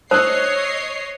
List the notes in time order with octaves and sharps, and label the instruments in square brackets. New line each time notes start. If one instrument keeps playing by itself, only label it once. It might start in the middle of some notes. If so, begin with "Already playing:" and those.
[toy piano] C5 [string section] C#5 D#5 C7 [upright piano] D#6 E6 F#6